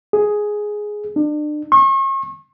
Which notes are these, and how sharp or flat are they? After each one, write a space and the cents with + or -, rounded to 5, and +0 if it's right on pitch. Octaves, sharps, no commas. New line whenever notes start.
G#4 +5
D4 +35
C#6 -40